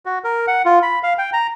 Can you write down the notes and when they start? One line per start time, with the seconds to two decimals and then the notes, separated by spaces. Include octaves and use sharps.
0.06 F#4
0.24 A#4
0.48 F#5
0.65 F4
0.83 B5
1.03 F5
1.18 G5
1.33 A#5